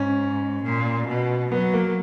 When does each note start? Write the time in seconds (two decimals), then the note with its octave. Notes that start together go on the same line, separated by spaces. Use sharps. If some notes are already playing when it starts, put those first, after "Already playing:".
Already playing: G#2 C#4
0.64 A#2
1.08 B2
1.52 F#3 B3
1.73 A#3